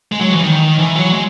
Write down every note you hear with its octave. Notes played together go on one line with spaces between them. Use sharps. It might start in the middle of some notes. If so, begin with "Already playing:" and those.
G#3
F#3
E3
D#3
E3
F#3
G#3